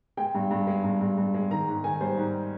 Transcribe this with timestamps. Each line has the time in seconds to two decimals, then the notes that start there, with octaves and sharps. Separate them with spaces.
0.17 G#3 G5
0.35 G2
0.51 G2
0.67 G#3
0.84 G2
1.01 G2
1.18 G2
1.34 G#3
1.50 D#3 A#5
1.68 G#2
1.84 D#3 G#5
2.01 G3 C5
2.18 G#2